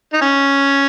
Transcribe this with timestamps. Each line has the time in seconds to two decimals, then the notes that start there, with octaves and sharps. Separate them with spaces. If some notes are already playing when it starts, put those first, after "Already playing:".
0.13 D#4
0.22 C#4